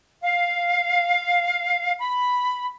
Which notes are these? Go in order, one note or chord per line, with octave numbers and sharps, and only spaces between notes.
F5
B5